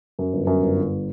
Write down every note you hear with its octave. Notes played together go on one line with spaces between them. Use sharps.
F#2
G1
F#2
G1
G1